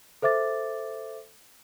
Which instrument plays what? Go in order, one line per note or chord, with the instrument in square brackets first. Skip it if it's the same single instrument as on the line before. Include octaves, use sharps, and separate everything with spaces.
[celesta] A4 C5 E5 D6 A6